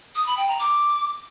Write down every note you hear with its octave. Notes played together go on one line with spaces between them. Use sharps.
D#6
B5
G5
A#5
D6